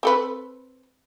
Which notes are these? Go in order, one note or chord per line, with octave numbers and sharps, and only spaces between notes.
C4 A4 B4